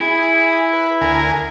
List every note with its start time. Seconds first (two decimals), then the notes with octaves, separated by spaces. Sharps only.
0.01 E4 G#4
0.73 B4
1.01 D2 A#4 G#5